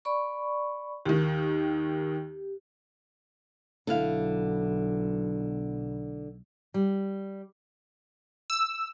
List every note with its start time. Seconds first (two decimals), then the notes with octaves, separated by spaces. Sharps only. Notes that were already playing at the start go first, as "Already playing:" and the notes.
0.05 D5 B5 C#6
1.05 D#2 D#3 G4
3.87 B1 D3 E4 F5
6.74 G3
8.50 E6